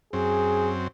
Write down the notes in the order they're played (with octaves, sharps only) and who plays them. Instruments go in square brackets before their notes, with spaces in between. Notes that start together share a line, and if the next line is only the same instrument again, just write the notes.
[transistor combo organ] F#2 C4 [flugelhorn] G#4